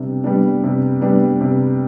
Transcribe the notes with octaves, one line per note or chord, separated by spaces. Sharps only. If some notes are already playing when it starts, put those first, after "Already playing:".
Already playing: C3 G3 B3 D4
G3 B3 D4
C3
G3 B3 D4
C3